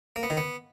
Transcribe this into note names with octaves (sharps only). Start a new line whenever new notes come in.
A#3
B3
D#3
B3